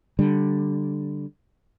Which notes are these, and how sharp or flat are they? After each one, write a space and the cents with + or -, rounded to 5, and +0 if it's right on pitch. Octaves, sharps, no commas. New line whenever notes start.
D3 +0 G3 +0